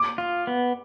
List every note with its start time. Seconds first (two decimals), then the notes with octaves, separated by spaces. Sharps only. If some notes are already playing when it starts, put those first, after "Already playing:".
Already playing: D6
0.18 F4
0.47 B3